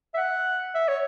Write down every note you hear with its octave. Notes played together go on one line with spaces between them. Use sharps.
E5
F#5
E5
C#5